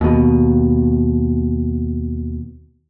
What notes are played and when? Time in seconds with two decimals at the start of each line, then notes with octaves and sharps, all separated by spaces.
0.01 D#2 B2